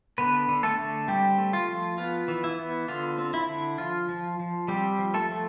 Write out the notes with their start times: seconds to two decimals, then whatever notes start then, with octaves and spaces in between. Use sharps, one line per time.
0.18 D3 B3 B4
0.48 D3
0.63 A3 A4
0.79 D3
1.08 G3 C4 G4
1.39 A3
1.53 F4
1.68 F3
1.98 B3 F4
2.28 E3
2.44 E4
2.59 B3
2.88 D3 F4
3.18 C4
3.34 E4
3.48 D3
3.78 F3 F4
4.09 F3
4.39 F3
4.68 G3 C4 G4
4.99 F3
5.14 A3 A4
5.29 F3